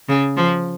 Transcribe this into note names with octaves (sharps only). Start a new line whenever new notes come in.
C#3
F3